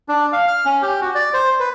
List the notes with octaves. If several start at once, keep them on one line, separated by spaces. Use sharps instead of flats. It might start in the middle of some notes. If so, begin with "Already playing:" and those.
D4
F5
F6
C#4
G4
F#4
D5
C5
B4